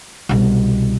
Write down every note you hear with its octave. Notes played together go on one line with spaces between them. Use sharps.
C2 B2